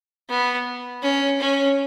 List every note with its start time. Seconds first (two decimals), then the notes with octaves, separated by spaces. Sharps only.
0.30 B3
1.03 C#4
1.41 C#4